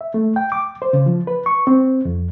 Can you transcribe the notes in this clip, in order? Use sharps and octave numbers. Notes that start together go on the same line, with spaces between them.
E5
A3
G5
D6
C5
C#3
F3
B4
C#6
C4
F2